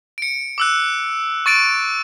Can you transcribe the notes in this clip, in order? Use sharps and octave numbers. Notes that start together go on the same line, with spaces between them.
C#7 D7
D6 E6 F#6
C#6 A6 D7 E7